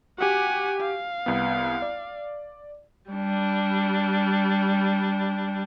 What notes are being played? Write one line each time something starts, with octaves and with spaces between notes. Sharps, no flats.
F#4 G4 F#5 G#5
F5
C2 B3
D5
G3 D4